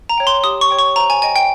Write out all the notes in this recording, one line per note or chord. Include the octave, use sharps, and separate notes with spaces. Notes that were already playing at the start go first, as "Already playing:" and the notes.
A#5
C#5 G5
C6
G4 D#6
C#6
C#5 G5
C#6
C5 A#5
G#5
D#5 G5 G#5
G5